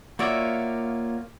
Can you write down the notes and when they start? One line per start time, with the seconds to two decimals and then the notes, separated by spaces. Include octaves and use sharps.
0.19 A#3 F4 F#4 C#5 D5 E5